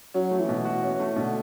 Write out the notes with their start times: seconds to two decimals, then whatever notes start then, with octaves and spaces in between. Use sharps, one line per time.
0.14 F#3 C#4
0.31 A3
0.39 E3
0.49 B2
0.65 F#4
0.83 C#4
1.00 A3
1.16 B2 D3